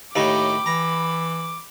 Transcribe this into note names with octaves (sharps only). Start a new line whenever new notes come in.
D#2 A2 D#4 G4 B5 D6
E3 A#5 B5